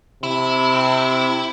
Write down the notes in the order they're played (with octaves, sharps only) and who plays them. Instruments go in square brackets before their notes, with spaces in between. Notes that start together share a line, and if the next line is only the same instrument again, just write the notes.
[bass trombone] C3 [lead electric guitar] E4